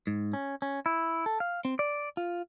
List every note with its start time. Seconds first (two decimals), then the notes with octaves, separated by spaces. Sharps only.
0.07 G#2
0.33 C#4
0.62 C#4
0.86 E4
1.26 A4
1.40 F5
1.65 C4
1.79 D5
2.17 F4